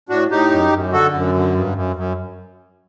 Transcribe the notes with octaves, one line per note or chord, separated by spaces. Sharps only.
A2 D4 F#4
A2 D#4 G4
F#2
F#2
D3 F#4 A4
F#2
D3
G2
F#2
F#2